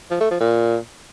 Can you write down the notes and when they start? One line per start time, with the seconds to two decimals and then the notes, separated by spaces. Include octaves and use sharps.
0.10 F3
0.20 A3
0.30 F3
0.40 A#2